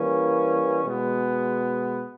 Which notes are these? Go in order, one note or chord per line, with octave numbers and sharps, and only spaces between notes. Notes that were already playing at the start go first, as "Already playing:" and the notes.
Already playing: E3 G3 A#3 C#4
B2 G#3 B3